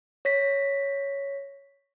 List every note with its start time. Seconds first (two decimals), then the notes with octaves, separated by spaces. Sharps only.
0.25 C#5 A#6 B6